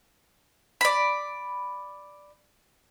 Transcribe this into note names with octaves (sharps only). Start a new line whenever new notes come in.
D5 B5